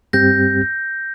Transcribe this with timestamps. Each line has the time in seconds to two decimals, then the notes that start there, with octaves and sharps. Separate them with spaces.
0.13 G2 G3 C4 G4 G6 A#6